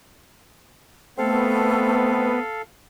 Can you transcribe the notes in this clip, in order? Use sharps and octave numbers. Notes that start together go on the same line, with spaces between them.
A3 B3 C4 A4 F5